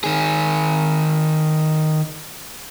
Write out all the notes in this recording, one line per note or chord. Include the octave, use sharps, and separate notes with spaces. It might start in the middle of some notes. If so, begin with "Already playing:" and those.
D#3 G#4